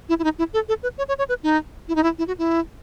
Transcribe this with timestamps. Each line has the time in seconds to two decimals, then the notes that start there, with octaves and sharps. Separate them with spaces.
0.09 E4
0.19 E4
0.24 D#4
0.38 E4
0.53 A4
0.68 A4
0.83 B4
0.98 C#5
1.08 C#5
1.18 C#5
1.29 B4
1.43 D#4
1.88 E4
1.95 D#4
2.03 E4
2.18 E4
2.27 F#4
2.38 E4